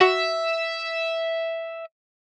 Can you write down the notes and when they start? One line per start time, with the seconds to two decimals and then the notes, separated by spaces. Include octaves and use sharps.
0.01 F#4 E5